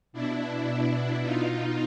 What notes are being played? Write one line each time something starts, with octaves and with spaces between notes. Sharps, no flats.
B2 D4 E4
B2
B2 D#4 F4